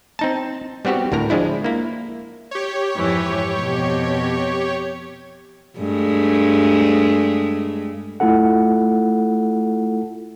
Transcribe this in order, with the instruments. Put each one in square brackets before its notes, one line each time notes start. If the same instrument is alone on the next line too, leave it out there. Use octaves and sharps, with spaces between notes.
[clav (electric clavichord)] C4 D#4 A5
G3 B3 C4 F#4 G4
D2 A2 A#4 A#5
F3 G#3 D4 E4
A#3 E4
[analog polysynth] G4 C#5
[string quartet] F2 G#2 E3
F2 B2
[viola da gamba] G2 G#3 A3
[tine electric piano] A3 E4 F4 A4 F#5